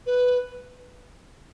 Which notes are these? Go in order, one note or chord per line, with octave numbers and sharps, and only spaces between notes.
B4